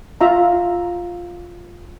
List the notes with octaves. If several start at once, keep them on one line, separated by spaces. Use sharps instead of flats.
F4 E5 A#5